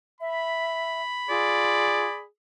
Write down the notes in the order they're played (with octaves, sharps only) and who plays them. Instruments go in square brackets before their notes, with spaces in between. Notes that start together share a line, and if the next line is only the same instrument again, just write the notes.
[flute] E5 [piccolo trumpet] B5
[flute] F4 [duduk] G#4 [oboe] D5